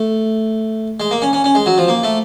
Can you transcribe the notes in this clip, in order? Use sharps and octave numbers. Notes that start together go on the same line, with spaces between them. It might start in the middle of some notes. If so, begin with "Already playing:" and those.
Already playing: A3
G#3
A#3
C#4
C#4
C#4
G#3
F#3
F3
A#3
A3